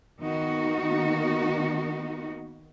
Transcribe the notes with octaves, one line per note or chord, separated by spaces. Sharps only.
D#3 A#3 B3 D#4 F#4